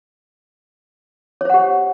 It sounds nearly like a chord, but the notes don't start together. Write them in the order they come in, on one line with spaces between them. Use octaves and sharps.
C#5 C5 F#5 G4